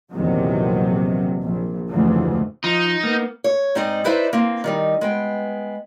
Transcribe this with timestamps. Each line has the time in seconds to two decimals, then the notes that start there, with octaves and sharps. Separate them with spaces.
0.11 A#1 E2 C3 D#3 F#3
1.42 A#1
1.89 F1 D2 G#2 C#3 E3 F3
2.64 F3 D#4
3.03 A#3 B3
3.44 C#5
3.75 G#2 C4 D#4 D5 D#5
4.04 D#4 E4 B4 C5 D5 E5
4.33 A#3 C4
4.64 D#3 G3 D#4
5.01 G#3 B3 G5